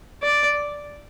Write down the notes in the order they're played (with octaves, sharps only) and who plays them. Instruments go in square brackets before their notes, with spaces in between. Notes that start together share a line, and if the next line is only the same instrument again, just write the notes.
[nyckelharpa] D5